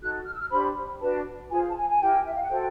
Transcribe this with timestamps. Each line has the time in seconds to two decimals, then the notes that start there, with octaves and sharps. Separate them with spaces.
0.01 D#4 F#4 A4 F#6
0.25 F6
0.34 E6
0.41 F6
0.50 D4 G4 C5 B5
1.00 D4 F#4 B4 A5
1.50 F4 G#4 C5 G#5
1.68 A5
1.75 G#5
1.89 G#5
2.00 E4 G4 A#4 G5
2.26 E5
2.33 F5
2.42 F#5
2.49 F#4 A4 C5 G5